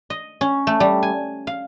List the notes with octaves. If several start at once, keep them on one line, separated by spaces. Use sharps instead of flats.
D#5
C#4
A3
G3
G#5
F5